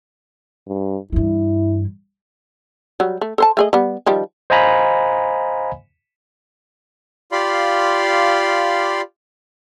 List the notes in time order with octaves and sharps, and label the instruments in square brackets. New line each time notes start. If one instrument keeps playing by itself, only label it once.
[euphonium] G2
[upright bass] G2 E3 [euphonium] E4
[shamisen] F#3 G3
A3
A4 C5 A5
A3 G#4 D#5
G3 B3
D#3 F3 G3
[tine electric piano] C5 D#5 F5 G#5 A#5 B5
[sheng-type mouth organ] F4 G4 D5 F5 B5 C6